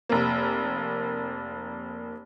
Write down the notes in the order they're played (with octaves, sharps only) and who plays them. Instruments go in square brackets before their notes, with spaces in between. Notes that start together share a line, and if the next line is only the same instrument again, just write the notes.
[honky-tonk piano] F1 A#3